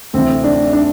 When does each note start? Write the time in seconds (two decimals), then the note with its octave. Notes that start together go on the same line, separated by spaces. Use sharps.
0.13 D2 C3 E3 C4
0.44 D4
0.73 D4